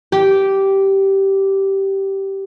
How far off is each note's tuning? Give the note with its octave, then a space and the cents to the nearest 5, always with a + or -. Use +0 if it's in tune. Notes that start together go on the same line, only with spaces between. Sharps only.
G4 -10